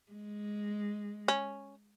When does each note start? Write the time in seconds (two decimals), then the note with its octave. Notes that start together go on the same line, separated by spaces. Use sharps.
0.11 G#3
1.28 C#4